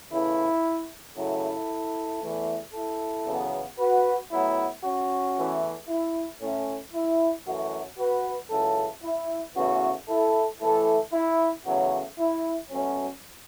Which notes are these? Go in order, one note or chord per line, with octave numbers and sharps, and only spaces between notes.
E2 C#3 E3 A3 E4
F#2 C#3 F#3 A3 E4 A4
E2 E3 A3
E4 A4
E2 C#3 F#3 B3
F#4 B4
A2 F#3 B3 E4
C#4 F#4
E2 E3 A3
E4
A2 A3 C#4
E4
F#2 E3 A3 C#4 F#4
F#4 B4
C#2 C#3 F#3 E4 A4
E4
E2 C#3 E3 A3 C#4 F#4
E4 A4
A2 E3 A3 E4 A4
E4
E2 C#3 F#3 A3 C#4 F#4
E4
B2 F#3 A3 C#4